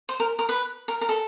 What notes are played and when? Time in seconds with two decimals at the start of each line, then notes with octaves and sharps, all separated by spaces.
0.09 C5
0.20 A#4
0.39 A#4
0.49 B4
0.88 A#4
1.01 A#4
1.09 A4